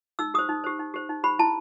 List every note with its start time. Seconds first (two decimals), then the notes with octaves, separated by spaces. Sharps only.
0.19 D#4 E6
0.34 G4 C5 D#6
0.49 D#4
0.64 G4 C5
0.79 D#4
0.94 G4 C5
1.09 D#4
1.24 G4 C5 B5
1.39 E4 A5